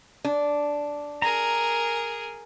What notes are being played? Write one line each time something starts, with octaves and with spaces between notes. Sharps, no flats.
D4
G#4 A#4 A#5